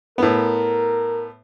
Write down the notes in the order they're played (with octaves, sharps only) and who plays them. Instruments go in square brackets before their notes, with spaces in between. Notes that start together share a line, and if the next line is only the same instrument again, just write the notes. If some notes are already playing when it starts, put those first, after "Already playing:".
[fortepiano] A2 B3 [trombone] A#4